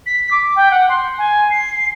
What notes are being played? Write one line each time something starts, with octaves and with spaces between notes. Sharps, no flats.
B6
D6
G5
F#5
C6
G#5
C7